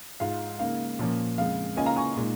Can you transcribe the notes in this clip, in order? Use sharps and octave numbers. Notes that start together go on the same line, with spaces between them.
G#2 G#3 F4 F5
C#3 A#3 D#4 F5
A#2 F3 A#3 C#4
F2 C#3 G#3 F5
C#3 A#3 C#4 F4 D#5 G#5
F5 A#5
G#5 C#6
A#2 G#3 D#4